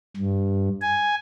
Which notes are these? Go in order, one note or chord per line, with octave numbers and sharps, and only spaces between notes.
G2
G#5